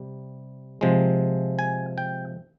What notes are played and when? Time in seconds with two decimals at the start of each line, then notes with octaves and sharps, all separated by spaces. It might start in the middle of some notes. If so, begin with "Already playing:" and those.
Already playing: C3 G3
0.81 C3 F3 G#3
1.59 G#5
1.98 G5